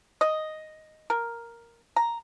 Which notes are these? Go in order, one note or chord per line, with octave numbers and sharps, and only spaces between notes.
D#5
A#4
A#5